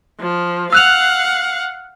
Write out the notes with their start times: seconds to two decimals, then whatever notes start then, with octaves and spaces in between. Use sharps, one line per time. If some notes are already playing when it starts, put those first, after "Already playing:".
0.20 F3
0.73 F5 F#5 E6 F#6 F7